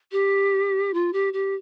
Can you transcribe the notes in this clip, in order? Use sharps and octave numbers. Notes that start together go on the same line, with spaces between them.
G4
F4
G4
G4